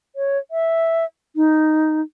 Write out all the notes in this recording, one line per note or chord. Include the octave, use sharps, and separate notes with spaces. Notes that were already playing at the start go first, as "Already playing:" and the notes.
C#5
E5
D#4